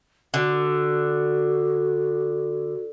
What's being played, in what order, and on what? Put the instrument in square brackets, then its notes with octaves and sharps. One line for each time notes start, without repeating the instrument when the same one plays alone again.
[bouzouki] D3 [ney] F#4